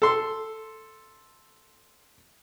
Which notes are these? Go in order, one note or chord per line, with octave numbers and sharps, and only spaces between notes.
A4 C6